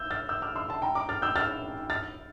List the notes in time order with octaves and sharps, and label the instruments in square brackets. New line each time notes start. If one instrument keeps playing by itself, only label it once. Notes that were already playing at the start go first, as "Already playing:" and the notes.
Already playing: [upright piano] E6 G6
F6 A6
E6 G6
D6 F6
C6 E6
A5 C6
G5 A#5
A#5 D6
F6 A6
E6 G6
F6 A6
F6 A6